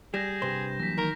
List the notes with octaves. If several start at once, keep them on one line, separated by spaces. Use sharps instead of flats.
G3 G#4 G6 A#6 E7
G2 C3 B4 C5
E3 F#3 A#3 A#6 B6
D#3 A#4